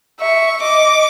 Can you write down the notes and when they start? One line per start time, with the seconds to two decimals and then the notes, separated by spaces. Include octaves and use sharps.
0.20 E5 C#6
0.61 D#5 D6